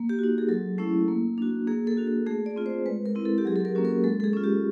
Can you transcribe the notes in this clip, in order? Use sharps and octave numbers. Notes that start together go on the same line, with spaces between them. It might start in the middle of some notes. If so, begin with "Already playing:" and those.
Already playing: A#3
G4
D#4 F#4
G#4
F#3 A4
A3 C#4 E4
A#3
D4 F#4
A#3 G#4
A4
D4 F#4
A4
A3 G#4
D5
C4 F4
C5
G#3 B4
A#4
C4 E4
A4
G4
F#3 G#4
A4
A#4
A#3 C#4 F#4
A#4
G#3 A4
A4
G#4
C#4 F4
G4